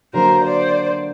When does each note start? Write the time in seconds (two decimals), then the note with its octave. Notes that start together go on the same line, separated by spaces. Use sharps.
0.13 D3 F#3 A#3 D4 F#4 A#4 C5
0.45 C5 D5